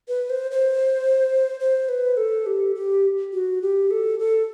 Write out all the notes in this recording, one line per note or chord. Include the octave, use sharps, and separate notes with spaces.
B4
C5
C5
C5
B4
A4
G4
G4
F#4
G4
A4
A4